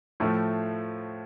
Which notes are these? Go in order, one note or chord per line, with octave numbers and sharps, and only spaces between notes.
A2 F3 A3